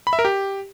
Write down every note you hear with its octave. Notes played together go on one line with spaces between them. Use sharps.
B5
E5
A#4
G4